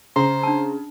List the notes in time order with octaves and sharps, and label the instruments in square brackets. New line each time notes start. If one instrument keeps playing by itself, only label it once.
[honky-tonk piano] C#3 [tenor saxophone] C5 [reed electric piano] A#5
[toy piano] D4 A5